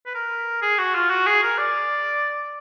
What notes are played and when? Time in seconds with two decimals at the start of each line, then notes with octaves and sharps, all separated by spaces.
0.06 B4
0.15 A#4
0.62 G#4
0.79 F#4
0.95 F4
1.10 F#4
1.26 G#4
1.43 A#4
1.58 D5